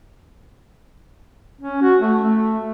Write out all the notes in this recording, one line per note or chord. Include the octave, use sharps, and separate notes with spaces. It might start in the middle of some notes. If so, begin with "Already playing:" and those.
C#4
F#4
A3
A3